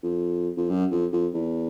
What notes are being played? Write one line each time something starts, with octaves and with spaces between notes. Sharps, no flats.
F2
F2
F#2
F2
F2
E2